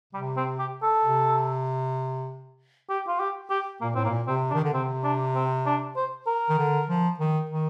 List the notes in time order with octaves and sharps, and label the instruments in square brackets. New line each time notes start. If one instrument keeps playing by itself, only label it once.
[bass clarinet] C3 [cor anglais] G3
[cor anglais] C4
G4
A4
[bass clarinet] C3
[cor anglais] G4
F4
G4
G4
[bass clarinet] A#2 [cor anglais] A#3
[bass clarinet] A2 [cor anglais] C4
[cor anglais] A#3
[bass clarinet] A#2
[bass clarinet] C3 [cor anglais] C4
[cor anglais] D4
[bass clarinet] D#3
D3
[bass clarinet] C3 [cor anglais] C4
[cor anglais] D4
C4
D4
C5
A#4
[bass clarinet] D#3
D3
F3
D#3
D#3